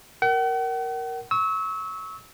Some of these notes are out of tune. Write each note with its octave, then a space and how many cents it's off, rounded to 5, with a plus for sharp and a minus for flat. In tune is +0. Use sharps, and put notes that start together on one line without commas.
A#4 +0 F#5 +45
C#6 +0 E6 -30